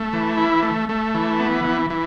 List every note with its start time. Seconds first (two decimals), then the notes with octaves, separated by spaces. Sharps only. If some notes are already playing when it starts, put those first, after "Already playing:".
Already playing: A3
0.13 E3
0.37 E4
0.63 A3
0.89 A3
1.15 E3
1.40 B3
1.65 E3
1.90 E3